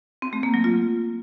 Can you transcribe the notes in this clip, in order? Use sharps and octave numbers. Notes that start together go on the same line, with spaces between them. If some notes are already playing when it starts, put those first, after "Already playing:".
C4
A3
A#3
F#3
F4